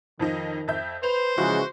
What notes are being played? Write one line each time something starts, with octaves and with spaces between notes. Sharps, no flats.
F2 D#3 F3 D#4
F2 E5 G6
B4 C5 F7
C#3 E3 F3 G#3 E4 F#4 C#6